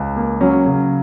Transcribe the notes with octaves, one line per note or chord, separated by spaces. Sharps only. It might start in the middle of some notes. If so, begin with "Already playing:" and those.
Already playing: C#2
A#3
F#3 C#4
C#3